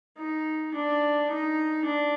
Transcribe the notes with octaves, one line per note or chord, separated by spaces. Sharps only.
D#4
D4
D#4
D4